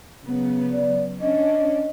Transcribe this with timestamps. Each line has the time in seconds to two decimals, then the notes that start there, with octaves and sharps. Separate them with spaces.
0.23 C#3 F#3 B3
0.71 D5
1.20 C#4 D4 D#5